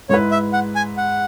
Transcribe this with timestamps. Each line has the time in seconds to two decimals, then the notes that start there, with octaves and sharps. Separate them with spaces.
0.09 G#2 G#3 E4 B4 C#5
0.31 E5
0.53 F#5
0.75 G#5
0.97 F#5